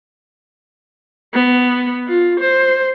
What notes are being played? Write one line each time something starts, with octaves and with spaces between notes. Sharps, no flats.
B3
F4
C5